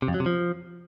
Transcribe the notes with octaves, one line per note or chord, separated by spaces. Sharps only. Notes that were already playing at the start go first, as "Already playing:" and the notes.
C3
F2
F#3
C3
F3